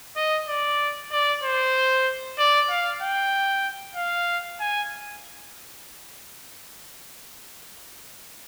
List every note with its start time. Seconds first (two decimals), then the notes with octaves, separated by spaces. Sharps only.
0.16 D#5
0.48 D5
1.12 D5
1.43 C5
2.39 D5
2.69 F5
3.02 G5
3.96 F5
4.60 G#5